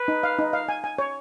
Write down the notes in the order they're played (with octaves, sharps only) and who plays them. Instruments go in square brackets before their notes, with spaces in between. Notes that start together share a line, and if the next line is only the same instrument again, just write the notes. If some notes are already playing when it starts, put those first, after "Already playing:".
Already playing: [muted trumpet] B4
[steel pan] D#4
F5
D#4
F5
G#5
G#5
C#5